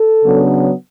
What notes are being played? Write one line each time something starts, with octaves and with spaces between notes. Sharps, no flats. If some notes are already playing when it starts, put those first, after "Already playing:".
Already playing: A4
C#3 F#3 B3 D4